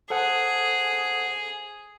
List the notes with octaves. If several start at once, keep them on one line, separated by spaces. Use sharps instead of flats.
G#4 A4 C5 F#5